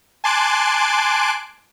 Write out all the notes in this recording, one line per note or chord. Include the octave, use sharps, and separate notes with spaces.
G#5 A5 C6 D6 F#6 D7